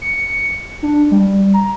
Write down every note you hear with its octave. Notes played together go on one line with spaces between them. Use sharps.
C#7
D4
G3
A#5